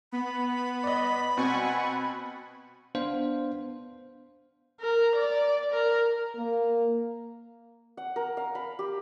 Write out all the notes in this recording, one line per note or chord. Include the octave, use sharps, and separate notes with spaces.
B3 B5
D5 D#5
B2 C4 F#5 G#5 C#6
B3 D4 C5 F5
A#4
D5
A#4
A#3
F#5
A#4
F5
B5
G4